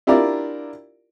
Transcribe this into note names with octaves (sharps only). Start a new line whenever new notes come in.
D4 E4 F4 G4 A#4 D5